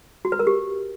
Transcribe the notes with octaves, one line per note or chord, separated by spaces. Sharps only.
F#4
B4
A#4
G4